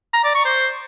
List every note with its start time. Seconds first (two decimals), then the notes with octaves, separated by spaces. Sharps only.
0.13 A#5
0.24 D5
0.35 C#6
0.45 C5